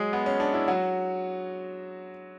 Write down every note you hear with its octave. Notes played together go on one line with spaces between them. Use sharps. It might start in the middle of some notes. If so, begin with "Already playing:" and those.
Already playing: F#3 G#3 G#4
B3
C#4
D4
E4
F#3 F#4